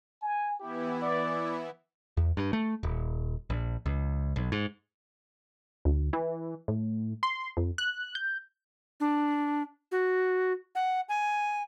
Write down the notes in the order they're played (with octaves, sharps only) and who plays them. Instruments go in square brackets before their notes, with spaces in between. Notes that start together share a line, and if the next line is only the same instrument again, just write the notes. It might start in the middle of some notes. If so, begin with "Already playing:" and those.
[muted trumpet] G#5
[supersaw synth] E3 B3 E4 [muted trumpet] G4
[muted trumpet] D5
[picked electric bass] E2
G2
A3
D#1
A#1
C#2
B1
G#2
[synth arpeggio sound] D2
E3
A2
C6
F2
F#6
G6
[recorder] D4
F#4
F#5
G#5